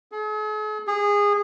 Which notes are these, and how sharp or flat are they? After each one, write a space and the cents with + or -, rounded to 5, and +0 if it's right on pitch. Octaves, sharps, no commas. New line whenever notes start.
G#4 +45
G#4 -20